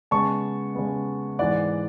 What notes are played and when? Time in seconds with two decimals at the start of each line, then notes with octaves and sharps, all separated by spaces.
0.11 C#3 G#3 B3 A5 C#6
0.75 C#3 G#3 B3
1.39 G#2 E3 G#3 B3 D5 F#5